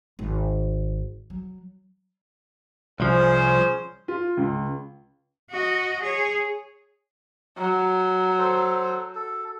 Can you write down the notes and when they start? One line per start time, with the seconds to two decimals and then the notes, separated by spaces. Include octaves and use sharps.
0.19 G#1
1.30 F#3
3.00 C2 F3 C#4 G#4 C5
4.08 F4
4.37 C#2
5.50 F#4 D#5
6.03 G#4 C#5
7.58 F#3
8.38 A4 C5
9.15 A4